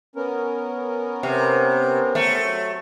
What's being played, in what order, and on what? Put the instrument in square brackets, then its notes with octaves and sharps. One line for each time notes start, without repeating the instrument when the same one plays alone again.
[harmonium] B3 C#4 A#4
[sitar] C3
A3
[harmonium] F#3